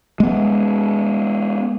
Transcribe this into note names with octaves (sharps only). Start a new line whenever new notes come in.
G#3 B3